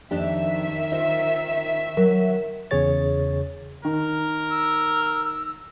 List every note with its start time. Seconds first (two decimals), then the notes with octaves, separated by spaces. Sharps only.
0.11 F2 D#3 D4 G4 E5
0.92 F4 C5 D#5
1.97 F#3 A#4
2.71 E2 C#3 G#4 C#5 A6
3.85 D#3 A#4
4.50 E6